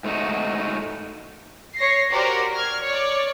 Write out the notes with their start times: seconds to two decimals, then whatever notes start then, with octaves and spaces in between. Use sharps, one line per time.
0.04 G#2 A3 D#4 F#4
1.76 C#5 A#6 C7
2.11 F#4 G4 A#4 C5 D5
2.54 F6 G#6
2.86 C#5 D5